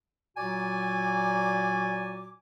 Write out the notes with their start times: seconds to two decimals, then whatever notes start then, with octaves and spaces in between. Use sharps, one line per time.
0.36 A#2 F#3 F#4 D5 G#5 D6